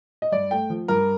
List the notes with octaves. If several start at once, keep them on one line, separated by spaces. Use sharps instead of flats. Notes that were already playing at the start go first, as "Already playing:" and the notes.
D#5
G2 D5
A3 G5
F3
G2 A#4